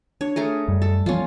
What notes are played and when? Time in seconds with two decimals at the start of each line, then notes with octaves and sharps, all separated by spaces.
0.21 D4 C#5
0.36 A3 G#4 A#4
0.68 F#2 G3
0.82 A4
1.06 E3 F3 B3 C#4 F4